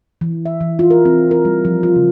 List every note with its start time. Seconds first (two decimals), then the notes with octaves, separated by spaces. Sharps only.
0.21 E3
0.46 E5
0.61 E3
0.79 F4
0.90 A#4
1.05 C4
1.31 A#4
1.45 G3
1.65 F3
1.83 F4
1.96 C#3